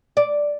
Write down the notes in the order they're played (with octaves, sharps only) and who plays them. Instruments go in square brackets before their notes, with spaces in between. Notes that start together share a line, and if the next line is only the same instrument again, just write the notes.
[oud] D5